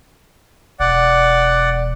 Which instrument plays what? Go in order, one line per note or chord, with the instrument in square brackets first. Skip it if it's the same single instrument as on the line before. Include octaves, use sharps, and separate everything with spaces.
[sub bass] E1 [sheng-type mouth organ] D5 F#5